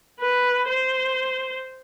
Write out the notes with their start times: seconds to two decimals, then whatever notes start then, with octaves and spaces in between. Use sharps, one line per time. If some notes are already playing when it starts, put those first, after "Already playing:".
0.21 B4
0.68 C5